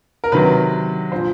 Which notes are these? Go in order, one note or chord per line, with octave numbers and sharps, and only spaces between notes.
A#4
C3 D#3 F#3 B4
A#2 F3 C5